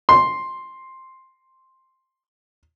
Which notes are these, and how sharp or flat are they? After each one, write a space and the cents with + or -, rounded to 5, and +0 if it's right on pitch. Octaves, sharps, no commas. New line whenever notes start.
C6 +5